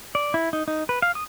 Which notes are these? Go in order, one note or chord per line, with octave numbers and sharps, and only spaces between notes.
D5
E4
D#4
D#4
B4
F5
D#6